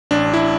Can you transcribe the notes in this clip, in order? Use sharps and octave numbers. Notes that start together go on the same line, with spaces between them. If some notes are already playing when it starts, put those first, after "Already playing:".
A1 D4
E4